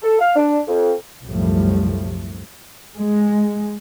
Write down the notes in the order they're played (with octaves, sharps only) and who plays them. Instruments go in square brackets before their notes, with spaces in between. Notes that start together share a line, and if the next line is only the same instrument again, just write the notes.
[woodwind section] A4
F5
D4
F2
[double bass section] C2 F#2 A2 F3 G3 A3
G#3